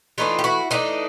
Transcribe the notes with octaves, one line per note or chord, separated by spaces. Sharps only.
E3 A3 D4 D#4 F4
G4
E4 F#4
E3 A3 D4 D#4 F4